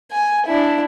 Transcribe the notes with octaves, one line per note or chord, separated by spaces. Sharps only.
G#5
D4 E4